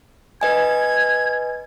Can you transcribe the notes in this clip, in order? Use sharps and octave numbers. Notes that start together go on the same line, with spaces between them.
B4 D#5 G#5 G#6